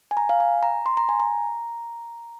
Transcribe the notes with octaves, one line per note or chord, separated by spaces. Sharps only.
G#5
A#5
F5
G#5
A#5
C6
A#5
G#5
A#5